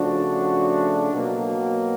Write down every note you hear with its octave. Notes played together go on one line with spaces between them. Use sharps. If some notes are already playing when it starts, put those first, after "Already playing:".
Already playing: C#3 F3 A3 D4 F#4
B2 F#3 A#3